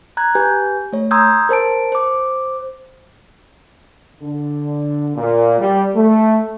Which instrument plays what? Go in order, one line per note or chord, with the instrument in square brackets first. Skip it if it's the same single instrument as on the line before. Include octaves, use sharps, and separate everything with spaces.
[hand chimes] A#5 F#6 G#6
G4 B4 G#5 G6
A3 C#5
A#5 C6 D#6 E6 G6 G#6
A#4 C5 A5 D7
C5 D6
[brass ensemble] D3
A#2
G3
A3